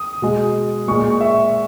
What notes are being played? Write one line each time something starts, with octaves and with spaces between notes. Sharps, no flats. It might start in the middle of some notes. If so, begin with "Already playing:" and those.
Already playing: D#6
B2 G#3
A#2 G#3 C#6
E5